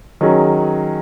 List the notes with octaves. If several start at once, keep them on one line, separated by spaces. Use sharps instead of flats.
D#3 F#3 C#4 G#4